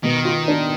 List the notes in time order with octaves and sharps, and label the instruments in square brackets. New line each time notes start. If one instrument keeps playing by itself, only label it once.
[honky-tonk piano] B2 [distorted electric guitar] D#3
[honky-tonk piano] F4
D4